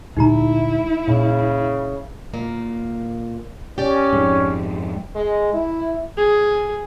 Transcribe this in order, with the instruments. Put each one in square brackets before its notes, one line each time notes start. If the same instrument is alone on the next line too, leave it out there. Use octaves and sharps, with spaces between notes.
[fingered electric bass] D2 A#2 G#3 [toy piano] D#4 G4 A#5 [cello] E4
[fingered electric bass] A#2 [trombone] C#3
[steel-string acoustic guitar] A#2 A#3
[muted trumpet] C#4 [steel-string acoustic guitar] G4 D5
[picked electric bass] F2 G#2
[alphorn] G#3
E4
[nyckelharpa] G#4